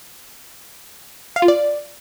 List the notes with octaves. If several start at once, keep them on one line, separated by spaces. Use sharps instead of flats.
F5
F4
D5